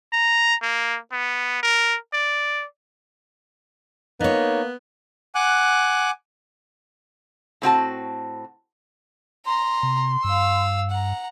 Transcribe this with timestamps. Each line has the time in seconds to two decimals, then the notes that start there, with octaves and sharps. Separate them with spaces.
0.12 A#5
0.62 A#3
1.12 B3
1.63 A#4
2.13 D5
4.20 A#3 B3 D#4 C#5
5.35 F#5 G#5 D6 F#6
7.62 A2 C4 F#4 A5
9.46 A#5 C6
9.83 C3
10.24 G2 F5 E6
10.90 F#5 A#5